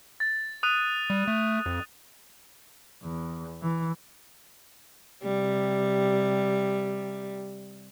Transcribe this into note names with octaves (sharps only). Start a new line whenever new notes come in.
A6
D#6 F#6 D#7
G3
A3
F2
E2
E3
C3 G3